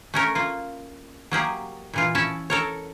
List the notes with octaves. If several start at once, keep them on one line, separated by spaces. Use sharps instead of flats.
A3 C#4 A#4
A#3 F4
F#3 A#3 G4 G#4
A#2 E3 F4
C#4 E4 E5 A5
A4 A#4 C#5